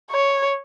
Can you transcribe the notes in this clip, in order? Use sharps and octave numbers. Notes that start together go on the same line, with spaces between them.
C#5